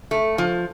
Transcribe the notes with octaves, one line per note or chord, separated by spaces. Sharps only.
A3
F3